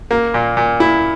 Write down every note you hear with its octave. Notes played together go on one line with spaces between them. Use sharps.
A#3
A#2
A#2
E4